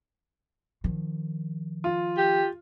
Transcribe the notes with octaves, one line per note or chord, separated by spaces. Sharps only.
D#3 F3
F4
G4